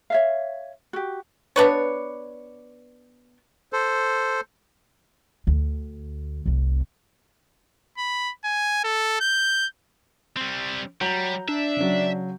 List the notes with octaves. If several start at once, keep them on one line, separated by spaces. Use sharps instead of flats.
C#5 E5 F5
F#4 G4
B3 D4 B4 C#5
A4 C5
D2
F1 C2
B5
G#5
A4
G6
G3 C4
F#3 G3 A#5 G6
D4 E5
C#3 F#3